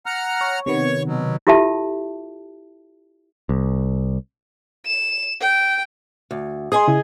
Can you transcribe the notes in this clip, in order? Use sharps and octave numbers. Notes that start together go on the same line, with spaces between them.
F#5 A#5 F6
C#5
C3 D#3 B3 C#5 C#6
B2 F#3
E4 F4 G4 A4 E5 A5
C2
E7
G5
D2
G#4 D#5 G#5 C6 D#6
C#3 E4